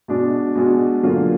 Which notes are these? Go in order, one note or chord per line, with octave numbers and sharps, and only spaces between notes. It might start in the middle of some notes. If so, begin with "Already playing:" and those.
B2 G#3 D4 F#4
B2 G#3 D4 F#4
D3 F#3 A#3 F4